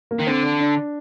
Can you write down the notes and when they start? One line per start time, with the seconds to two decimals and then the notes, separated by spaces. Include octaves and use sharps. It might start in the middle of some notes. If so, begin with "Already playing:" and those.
0.11 A#3
0.19 D#3
0.27 D3 C4
0.43 D4
0.60 D4